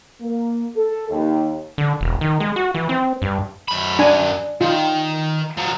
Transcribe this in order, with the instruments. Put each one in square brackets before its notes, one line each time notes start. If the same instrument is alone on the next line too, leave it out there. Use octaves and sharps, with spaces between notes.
[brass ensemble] A#3
A4
D#2
[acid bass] D3
E1
D#3
G#3
F#4
E3
C4
G2
[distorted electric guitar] F#2 B5
[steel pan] D4 G#5
[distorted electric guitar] D#3 [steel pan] F4
[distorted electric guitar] F3 F#3